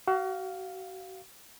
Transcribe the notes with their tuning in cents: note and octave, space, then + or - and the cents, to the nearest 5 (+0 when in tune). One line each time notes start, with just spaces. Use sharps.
F#4 +35 F5 +0